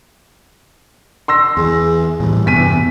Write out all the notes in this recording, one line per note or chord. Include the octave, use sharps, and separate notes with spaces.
C6 E6 A#6
E2 G#4
A2 E3 G3
E2 G2 C3 B6 D#7